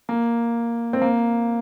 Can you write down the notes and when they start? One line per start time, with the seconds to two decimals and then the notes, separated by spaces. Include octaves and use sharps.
0.09 A#3
0.93 C4
1.02 A#3